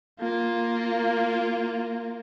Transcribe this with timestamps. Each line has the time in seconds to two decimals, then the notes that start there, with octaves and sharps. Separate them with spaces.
0.20 A#3 F4